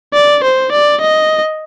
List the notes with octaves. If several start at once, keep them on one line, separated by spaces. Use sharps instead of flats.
D5
C5
D5
D#5